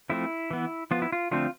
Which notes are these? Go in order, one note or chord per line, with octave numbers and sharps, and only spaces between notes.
F3 A3 C4 E4
E3 B3
F3 B3 F4
E4
F4
D3 F3 A3 C4 F4